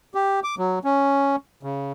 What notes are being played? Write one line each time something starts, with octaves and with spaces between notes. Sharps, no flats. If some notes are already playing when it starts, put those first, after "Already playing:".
G4
D6
F#3
C#4
C#3